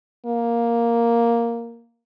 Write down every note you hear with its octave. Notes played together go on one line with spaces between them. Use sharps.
A#3